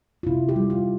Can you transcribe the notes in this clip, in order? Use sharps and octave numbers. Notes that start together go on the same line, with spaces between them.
F4
C3 E4
G4
G3
F4